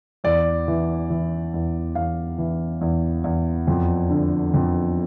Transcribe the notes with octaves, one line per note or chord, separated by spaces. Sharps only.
E2 D5
E3
E3
E2
E2 F5
E3
E2
E2
F2
D3
F2